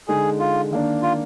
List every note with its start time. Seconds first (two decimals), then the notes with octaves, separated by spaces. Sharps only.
0.08 D3 G#3 D#4 G#4
0.39 F4
0.71 D#3 A#3 D4
1.02 F4